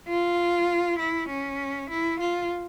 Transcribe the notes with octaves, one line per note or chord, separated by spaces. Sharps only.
F4
E4
C#4
E4
F4